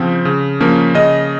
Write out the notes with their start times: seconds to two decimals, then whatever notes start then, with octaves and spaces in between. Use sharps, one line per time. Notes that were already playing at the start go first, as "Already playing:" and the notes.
Already playing: C#3 F3 C4
0.25 C#3
0.60 F3 A#3 C#4
0.94 C#3 D#5